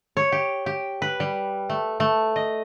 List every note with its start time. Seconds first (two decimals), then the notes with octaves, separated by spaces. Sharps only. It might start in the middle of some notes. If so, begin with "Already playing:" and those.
0.17 C#5
0.32 G4
0.66 G4
1.02 B4
1.20 G3
1.69 A3
2.00 A3
2.36 D#5